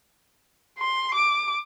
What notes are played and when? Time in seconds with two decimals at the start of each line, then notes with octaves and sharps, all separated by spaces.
0.79 C6
1.14 D6